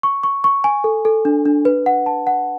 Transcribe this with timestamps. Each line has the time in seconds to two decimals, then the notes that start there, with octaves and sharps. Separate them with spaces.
0.03 C#6
0.24 C#6
0.44 C#6
0.64 G#5
0.84 A4
1.05 A4
1.25 D4
1.46 D4
1.65 B4
1.86 F#5
2.06 A5
2.27 F#5